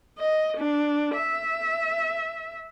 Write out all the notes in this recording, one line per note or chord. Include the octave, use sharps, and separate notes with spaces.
D#5
D4
E5